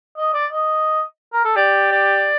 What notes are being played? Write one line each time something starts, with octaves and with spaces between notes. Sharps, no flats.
D#5
D5
D#5
A#4
A4
G4 D5
D5